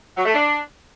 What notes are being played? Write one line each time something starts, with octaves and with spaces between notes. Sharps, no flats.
F#3
A3
D4